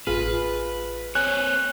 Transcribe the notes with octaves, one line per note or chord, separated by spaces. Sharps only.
A1 F4 G#4 B4 F6
C4 C#5 G#5 F#6